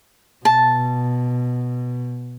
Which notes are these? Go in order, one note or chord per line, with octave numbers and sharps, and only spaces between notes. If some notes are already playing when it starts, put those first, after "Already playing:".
B2 A5